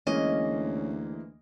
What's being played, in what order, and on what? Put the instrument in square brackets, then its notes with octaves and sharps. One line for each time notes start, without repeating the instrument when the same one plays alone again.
[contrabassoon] D2 [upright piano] E3 G#3 A#3 [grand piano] C#4 [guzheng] D#5